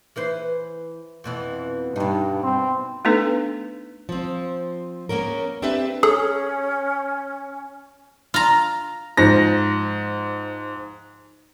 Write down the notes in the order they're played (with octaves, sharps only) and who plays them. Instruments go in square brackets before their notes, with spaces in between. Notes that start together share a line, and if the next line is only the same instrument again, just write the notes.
[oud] E3 B4 C5
F2 B2 E3
[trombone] G2 [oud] B2 D#4
[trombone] C4
[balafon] A3 B3 D4 D#4 A4 B4
[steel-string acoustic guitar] F3 C4
A#3 B3 C#4 A#4
C4 D4 G4 B4 E5
[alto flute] C#4 [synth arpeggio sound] G#4 A4
[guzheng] F4 A#5
[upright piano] G#2 F3 A#6